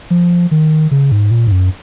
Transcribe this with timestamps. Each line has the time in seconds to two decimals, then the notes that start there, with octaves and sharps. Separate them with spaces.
0.10 F3
0.51 D#3
0.91 C#3
1.12 G#2
1.31 A#2
1.47 G#2
1.52 F#2